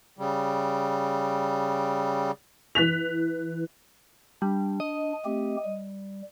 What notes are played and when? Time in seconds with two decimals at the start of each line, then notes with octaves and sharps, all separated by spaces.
0.18 C#3 G3
2.75 E3 F#6 B6 F7
4.42 G3 D4
4.80 D#5
5.25 A3 C4 G4
5.65 G3